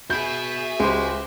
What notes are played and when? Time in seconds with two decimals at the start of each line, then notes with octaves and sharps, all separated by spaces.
0.10 F#4 G#4 E5 B5 G6
0.80 C#2 G#3 G4 C5